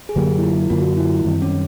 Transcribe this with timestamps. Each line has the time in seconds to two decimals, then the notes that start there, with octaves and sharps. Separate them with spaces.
0.09 G#4
0.16 F#2 D3 F#3 A#3 G4
0.38 E4
0.43 F4
0.70 F#2 D3 F#3 A#3 F4
0.80 F#4
0.89 F4
0.97 E4
1.25 F#2 D#3 G3 C4
1.42 C#4